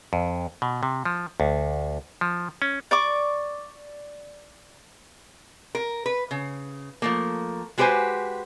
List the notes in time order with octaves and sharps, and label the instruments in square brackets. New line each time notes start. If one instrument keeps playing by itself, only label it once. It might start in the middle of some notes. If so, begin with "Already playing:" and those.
[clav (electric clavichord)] F2
B2
C3
F3
D2
F3
C#4
[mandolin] D5 C#6 D6
[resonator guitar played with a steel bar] A#4
B4
C#3
F3 A3 A#3
G#3 F#4 G4 B4 C5 G#5